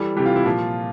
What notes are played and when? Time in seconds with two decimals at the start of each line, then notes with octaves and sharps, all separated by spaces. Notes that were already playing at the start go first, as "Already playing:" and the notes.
Already playing: E3 G3 A4
0.17 C3 E3 G3 G4
0.26 F4
0.36 E4
0.45 A#2 F3 F4